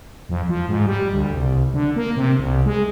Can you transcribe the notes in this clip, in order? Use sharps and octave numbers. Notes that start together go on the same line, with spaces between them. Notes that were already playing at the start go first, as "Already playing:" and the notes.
F2
F3
G#2
G3
D2
C2
D3
A#3
C3
C2
G#3